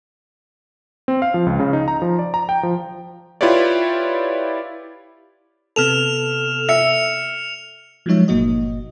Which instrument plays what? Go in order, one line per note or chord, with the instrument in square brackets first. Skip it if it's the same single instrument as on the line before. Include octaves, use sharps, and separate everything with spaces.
[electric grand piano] C4
F5
F3
C#2
C#3
D#4
A#5
F3
D5
A#5
G5
F3
E4 F4 G4 B4 C#5 D5
[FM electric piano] C3 B3 A4 [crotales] F6 E7 F7
[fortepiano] E5 [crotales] C#7 F7
[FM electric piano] F3 F#3 G#3 D#4 C#5 E5
G1 A#2 A#3 F#4 D#5